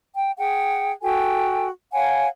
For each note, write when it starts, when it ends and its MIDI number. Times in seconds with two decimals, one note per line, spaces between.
0.16 0.32 79
0.38 0.92 68
0.38 0.92 78
0.38 0.92 79
1.02 1.68 66
1.02 1.68 69
1.02 1.68 79
1.02 1.68 80
1.92 2.27 73
1.92 2.27 77
1.92 2.27 78
1.92 2.27 80